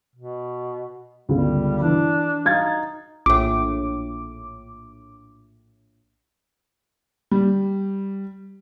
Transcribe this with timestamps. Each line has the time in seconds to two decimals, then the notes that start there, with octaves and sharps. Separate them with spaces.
0.16 B2
1.29 G1 C#2 G3
1.82 E3 D4
2.45 D#4 F5 G#6 A6
3.26 A#1 A2 D6
7.31 G3